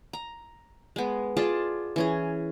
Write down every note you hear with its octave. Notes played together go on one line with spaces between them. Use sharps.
A#5
G#3 B3
F4 G#4 D5 A5
E3 C#4 G#4